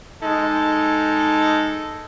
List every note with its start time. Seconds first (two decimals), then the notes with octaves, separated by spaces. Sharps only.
0.23 G#3 D#4 A4